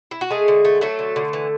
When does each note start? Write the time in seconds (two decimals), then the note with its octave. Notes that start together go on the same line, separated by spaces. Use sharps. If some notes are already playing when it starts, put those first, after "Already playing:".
0.11 E4
0.21 F#4
0.31 G#3 A3 G#4
0.48 D3
0.65 A3
0.81 F#3 A3 A4
0.99 D3
1.16 D3
1.33 E3